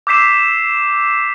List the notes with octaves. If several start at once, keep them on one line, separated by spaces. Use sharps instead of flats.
D6 E6 G6 B6 C7 E7